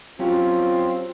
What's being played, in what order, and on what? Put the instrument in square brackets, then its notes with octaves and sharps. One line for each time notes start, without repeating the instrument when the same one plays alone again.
[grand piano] F#3 C#4 G4 [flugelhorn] C4 [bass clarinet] F4